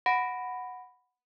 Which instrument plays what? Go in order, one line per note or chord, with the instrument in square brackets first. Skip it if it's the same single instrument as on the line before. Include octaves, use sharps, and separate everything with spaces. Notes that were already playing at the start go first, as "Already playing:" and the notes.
[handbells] F#5 B5 A#6 D7